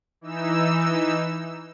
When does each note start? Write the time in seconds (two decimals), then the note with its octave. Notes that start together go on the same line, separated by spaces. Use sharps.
0.21 E3 D#4 E6